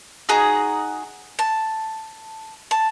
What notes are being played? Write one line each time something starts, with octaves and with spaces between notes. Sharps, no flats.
D#4 F#4 G#4 A#5
A5
A5